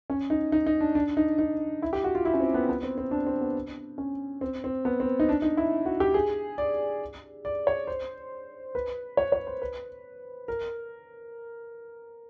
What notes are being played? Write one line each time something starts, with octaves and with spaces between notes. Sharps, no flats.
C#4
D#4
D#4
D#4
D4
D4
D#4
D#4
E4
G4
F#4
F4
E4
C#4
C4
B3
B3
C4
C4
D4
C4
B3
C#4
C4
C4
B3
C4
D#4
D4
D#4
E4
F#4
G4
G#4
D5
D5
C#5
C5
B4
C#5
C#5
C5
B4
A#4